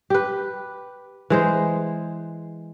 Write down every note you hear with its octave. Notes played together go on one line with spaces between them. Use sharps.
G4 B4
E3 G#3 C5